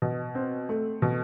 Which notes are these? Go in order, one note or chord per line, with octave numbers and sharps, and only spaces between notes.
B2
C4
A3
B2